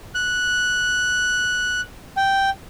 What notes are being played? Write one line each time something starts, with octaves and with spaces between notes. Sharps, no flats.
F#6
G5